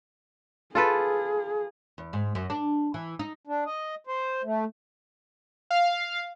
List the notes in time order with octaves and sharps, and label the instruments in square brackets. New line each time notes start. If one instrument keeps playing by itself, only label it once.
[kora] F4 A4 B4 [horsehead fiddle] G#4
[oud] E2
G#2
F#2
D4
E3
D#4
[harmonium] D4
D#5
C5
A3
[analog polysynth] F5